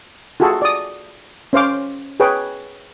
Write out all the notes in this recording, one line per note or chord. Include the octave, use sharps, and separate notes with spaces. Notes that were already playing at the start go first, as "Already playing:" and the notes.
F4 F#4 G#4 A4
D5 D#6
C#4 C5 F5 D6
G#4 B4 C#5 G5